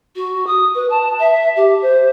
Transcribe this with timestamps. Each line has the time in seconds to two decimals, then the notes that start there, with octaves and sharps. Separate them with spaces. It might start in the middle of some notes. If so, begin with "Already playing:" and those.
0.16 F#4
0.47 D#6
0.75 B4
0.90 A5
1.20 E5
1.56 G4
1.82 C5